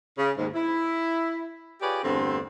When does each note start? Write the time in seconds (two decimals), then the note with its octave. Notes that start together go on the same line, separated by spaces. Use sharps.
0.18 C#3
0.37 D#2 G#2
0.54 E4
1.82 F4 G4 G#4 B4 C#5 D5
2.04 E2 G2 D3 A3 C4